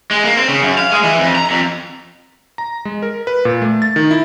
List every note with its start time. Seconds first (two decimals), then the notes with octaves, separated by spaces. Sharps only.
0.11 G#3
0.25 A#3
0.37 C4
0.49 C#3
0.62 F#2
0.78 F5
0.91 G#3
1.04 E3
1.19 F2
1.35 A#5
1.50 F2
2.58 A#5
2.85 G#3
3.02 A#4
3.27 B4
3.45 A#2
3.62 A3
3.82 A6
3.96 D#3
4.11 E4